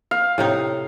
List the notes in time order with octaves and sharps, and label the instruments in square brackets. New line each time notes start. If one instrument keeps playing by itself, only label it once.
[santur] F5
[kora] A2 C3 D#4